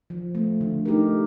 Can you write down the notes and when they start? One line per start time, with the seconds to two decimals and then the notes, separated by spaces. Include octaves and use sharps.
0.10 F3
0.35 A3 C4
0.61 D3
0.85 A3 D#4 G4 A#4